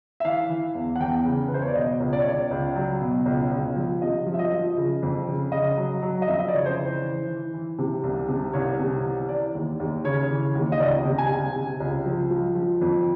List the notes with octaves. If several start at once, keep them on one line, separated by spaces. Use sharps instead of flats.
E5
E3 F5
E3
E2
F#5
E2 G5
C#3
B4
E2 C5
C#5
D5
B2 D#5
C#2
D5
C#5
C#2 D5
C#2
F#3
B2
C#2
C#2
F3
C3 D#5
F3
E5
D#5
F3
C#3
F2
C#3
C#3 D#5
F#3
F#3
D#5
F2 E5
D#5
D5
C#3 C#5
C5
E3
E3
E3
E3
C3
C2
C3
C2 C#5
C3
E3
E3 D5
D#2
D#2
C#3 C#5
E3
D#2
D#5
C#2 D5
C3
G#5
C3
C3
C#2
F3
F3
F3
F2